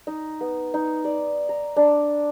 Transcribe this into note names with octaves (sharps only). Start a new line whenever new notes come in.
D#4
B3
D#4
D5
A#5
D4